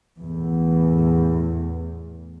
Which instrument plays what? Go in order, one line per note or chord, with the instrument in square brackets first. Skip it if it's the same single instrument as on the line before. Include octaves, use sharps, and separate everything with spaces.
[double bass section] E2 A2